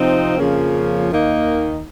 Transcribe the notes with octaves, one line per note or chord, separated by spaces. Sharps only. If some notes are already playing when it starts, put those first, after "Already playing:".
Already playing: C3 F3 C4 D#4
F2 C#3 F3 A#3 C#4
D#2 D#3 A#3 D#4